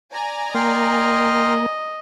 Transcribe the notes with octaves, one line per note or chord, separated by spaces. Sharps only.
D5 G#5 A#5
A#3 D#5 G5 C6 F6